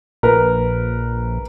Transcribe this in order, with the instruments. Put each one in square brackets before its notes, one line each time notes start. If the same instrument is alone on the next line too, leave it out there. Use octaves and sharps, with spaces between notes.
[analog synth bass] A#1 [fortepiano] A#4 B4